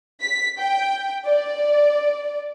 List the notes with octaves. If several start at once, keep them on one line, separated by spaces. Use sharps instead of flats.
B6
G5
D5